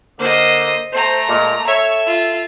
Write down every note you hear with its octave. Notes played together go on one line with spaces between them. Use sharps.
D3 A#3 C5 D#5
A3 C5 A#5
A#2 G#3
A4 C#5 E5
F4